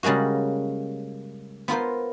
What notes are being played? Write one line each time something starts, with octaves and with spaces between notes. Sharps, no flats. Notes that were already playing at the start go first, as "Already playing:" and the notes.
C#3 G3 G#3 A#3 F#4
B3 F4 A#4 C5